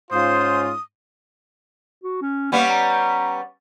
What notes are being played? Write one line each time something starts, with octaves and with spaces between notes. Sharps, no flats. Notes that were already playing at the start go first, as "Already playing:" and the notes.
G#2 C#4 F4 C5 D#6
F#4
C#4
G3 A#3 B3 C#4
A#5